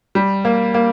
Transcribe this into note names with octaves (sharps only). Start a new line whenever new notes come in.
G3
A#3
A#3